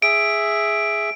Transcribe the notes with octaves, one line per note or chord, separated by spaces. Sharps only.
G#4 E5 D7